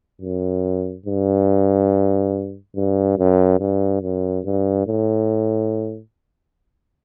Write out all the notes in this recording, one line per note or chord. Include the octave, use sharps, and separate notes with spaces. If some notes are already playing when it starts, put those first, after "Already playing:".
F#2
G2
G2
F#2
G2
F#2
G2
A2